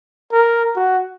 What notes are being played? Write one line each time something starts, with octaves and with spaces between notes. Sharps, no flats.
A#4
F#4